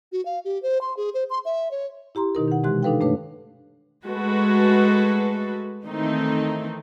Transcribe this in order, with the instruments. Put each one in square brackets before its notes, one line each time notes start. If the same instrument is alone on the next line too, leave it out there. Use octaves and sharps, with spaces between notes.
[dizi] F#4
F5
G4
C5
C6
G#4
C5
C6
E5
C#5
[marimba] E4 G4 A#5 C6
B2 D#3 D#4 A#4
D#3 F#5
C3 E3 G#3 G4 C6 F#6
D4 D#4 A4 B4 F5 G5
G2 A3 D4 B4 C#5
[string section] G#3 A3 F#4 A4 B4
D#3 E3 A3 C4 D#4